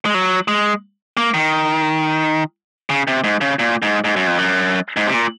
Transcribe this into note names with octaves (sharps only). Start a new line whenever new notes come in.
G#3
F#3
G#3
A#3
D#3
C#3
C3
G#2
C#3
A#2
G#2
G#2
F#2
F2
F#2
G#2
C3
A#2